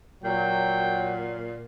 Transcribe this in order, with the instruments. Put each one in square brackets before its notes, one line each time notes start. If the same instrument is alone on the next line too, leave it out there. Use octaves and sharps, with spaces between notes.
[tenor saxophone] A#2 [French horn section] F#3 [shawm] G5